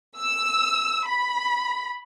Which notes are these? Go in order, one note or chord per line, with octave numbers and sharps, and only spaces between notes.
E6
B5